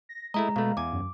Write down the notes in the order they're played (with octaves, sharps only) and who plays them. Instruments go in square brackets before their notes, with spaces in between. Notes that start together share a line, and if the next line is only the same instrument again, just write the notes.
[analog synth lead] A#6
[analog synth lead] G#3 [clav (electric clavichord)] A3 E4 D#5 [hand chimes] A#5
[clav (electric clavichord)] B2 A3 [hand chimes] F5
[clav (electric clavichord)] E2 G#5 [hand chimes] D6
[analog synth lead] F#2